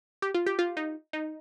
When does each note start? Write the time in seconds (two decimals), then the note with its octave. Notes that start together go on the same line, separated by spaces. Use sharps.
0.22 G4
0.35 F4
0.46 G4
0.59 F4
0.77 D#4
1.13 D#4